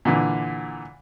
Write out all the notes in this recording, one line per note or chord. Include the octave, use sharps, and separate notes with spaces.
A#2 D3 E3